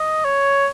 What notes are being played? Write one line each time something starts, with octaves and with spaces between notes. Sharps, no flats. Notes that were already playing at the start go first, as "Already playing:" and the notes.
Already playing: D#5
C#5